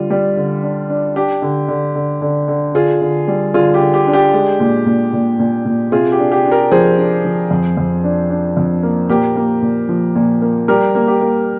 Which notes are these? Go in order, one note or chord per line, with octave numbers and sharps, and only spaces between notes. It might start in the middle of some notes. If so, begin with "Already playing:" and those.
Already playing: D3 G3 F4
G3
D3
D4
D4
D4 G4
D3
D3
D3
D3
D3
D3 F4 G#4
D3
G3
D3 F4 G#4
G4
D3
G4
D4
G4
G#3
A#2
A#2
A#2
A#2
A#2
C3 F4 G#4
G4
D4
G4
D4
G4 A#4
F3 G#4 C5
D4
F3
F2
F2
D4
D4
F2
A#3
A#2 G4 A#4
A#3
A#2
F3
A#2
A#3
G3 G4 A#4
A#3
G4
A#3